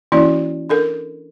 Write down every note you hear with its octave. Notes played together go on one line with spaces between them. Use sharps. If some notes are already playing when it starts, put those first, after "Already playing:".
E3 A#3 C#4 E4 F#4 D5
D4 A4 A#4